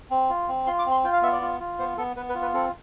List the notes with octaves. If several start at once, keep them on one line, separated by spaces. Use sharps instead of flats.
C4
F4
C4
F4 C6
D6
C4
C6
F4 G5
F5
B3 E5
D5
F4
F4
B3 C5
B3 A4
B3 B4
B4
F4
B4
C4 A4